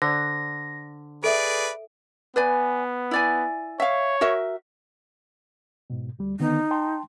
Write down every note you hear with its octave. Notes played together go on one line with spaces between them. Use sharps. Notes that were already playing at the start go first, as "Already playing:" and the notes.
D3 C5 D5 A#6
G#4 A4 B4 D5 E5 D7
B3 B4 D5 G#5
E4 D5 G#5
C#5 E5 F5
F#4 A#4 E5
G#2 B2
D2 G3
D3 D#3 B3 D#4
G5 A5 C6